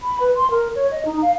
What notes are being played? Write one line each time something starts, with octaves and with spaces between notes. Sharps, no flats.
B5
B4
C6
A#4
C#5
D#5
D#4
F5